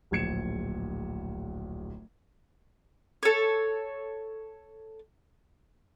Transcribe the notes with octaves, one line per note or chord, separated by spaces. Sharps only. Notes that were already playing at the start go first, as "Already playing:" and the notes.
D1 A#1 G#6 C#7 E7
A4 C#5